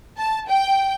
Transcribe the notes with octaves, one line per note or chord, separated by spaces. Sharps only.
A5
G5